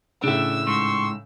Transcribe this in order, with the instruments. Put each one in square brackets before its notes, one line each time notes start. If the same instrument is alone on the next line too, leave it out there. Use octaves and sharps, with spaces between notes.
[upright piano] A2 C#3 [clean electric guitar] D4 E5 [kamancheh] E6
[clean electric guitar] G#2 [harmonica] C6 C#6